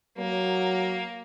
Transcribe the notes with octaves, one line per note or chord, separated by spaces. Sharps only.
F#3 A#3